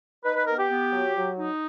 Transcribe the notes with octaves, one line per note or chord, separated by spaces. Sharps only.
D#4 B4
B4
B3 A#4
G4
B3
F#3
F#3
D#4